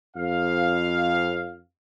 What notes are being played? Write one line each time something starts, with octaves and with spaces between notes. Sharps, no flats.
F2 F5